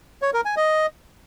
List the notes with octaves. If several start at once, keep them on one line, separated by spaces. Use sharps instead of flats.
C#5
A#4
G#5
D#5